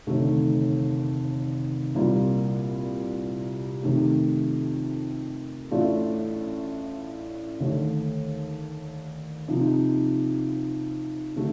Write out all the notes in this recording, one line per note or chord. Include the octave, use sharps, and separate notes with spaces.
F1 D#2 D3 A3 D#4
C2 A#2 G3 A#3 F4
F2 C3 D#3 A3
A1 A2 A3 D4 F4
D#2 D3 A3
C3 F3 A#3 D#4
D3 A3